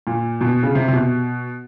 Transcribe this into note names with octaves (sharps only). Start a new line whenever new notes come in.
A#2
B2
C#3
C3
C3
B2